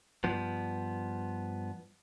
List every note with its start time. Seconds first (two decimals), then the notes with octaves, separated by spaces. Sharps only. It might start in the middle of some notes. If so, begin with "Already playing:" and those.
0.24 G2 F3 B3